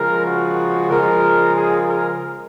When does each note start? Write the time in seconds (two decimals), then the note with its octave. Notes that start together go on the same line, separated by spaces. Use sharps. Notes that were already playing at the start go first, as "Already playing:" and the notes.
Already playing: C#3 F3 G#3 A#4
0.25 F#4
0.89 C#3 F3 G#3 A#4
1.55 G#4
1.87 A#4